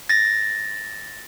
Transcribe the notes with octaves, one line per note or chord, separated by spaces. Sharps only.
A6 A#6